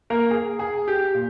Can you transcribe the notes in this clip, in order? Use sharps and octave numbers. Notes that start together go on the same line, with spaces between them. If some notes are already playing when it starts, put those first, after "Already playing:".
A#3 A#4
G#4
G#4
G4
A#2